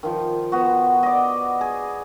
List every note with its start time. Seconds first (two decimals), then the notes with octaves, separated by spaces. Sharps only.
0.03 D#3 F3
0.52 B3 F#4
1.03 D5 D#5
1.61 G#4